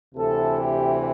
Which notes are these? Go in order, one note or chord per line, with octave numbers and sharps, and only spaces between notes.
D2 C3 E3 A4
G4